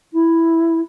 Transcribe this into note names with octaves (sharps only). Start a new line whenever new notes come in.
E4